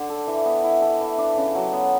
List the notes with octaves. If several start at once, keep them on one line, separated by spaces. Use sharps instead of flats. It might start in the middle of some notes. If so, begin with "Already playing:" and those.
Already playing: D3
A4
E3
B3
E4
A4
E3
D4
C#3
F#3
B3